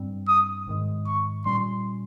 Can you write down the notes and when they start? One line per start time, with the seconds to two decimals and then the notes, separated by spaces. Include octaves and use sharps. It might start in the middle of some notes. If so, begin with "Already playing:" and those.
Already playing: G2 G3 C4
0.28 D#6
0.67 G#2 D#3 G#3
1.07 C#6
1.46 A#2 G3 C#4 C6